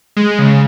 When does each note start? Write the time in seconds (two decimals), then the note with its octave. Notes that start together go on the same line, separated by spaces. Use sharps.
0.17 G#3
0.39 C#3